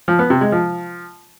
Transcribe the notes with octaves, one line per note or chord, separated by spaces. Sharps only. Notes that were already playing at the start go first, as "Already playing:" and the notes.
F3
B3
C3
G#3
F3